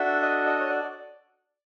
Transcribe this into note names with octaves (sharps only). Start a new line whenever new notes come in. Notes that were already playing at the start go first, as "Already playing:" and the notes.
Already playing: D4 F#4 A4 E5
D#5
D#5
C#5
D5